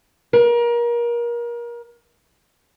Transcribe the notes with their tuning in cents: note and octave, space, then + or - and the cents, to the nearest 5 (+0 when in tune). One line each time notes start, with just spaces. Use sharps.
A#4 +30